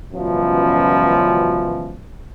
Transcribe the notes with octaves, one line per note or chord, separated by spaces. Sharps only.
C#2 F#2 B2 E3 F3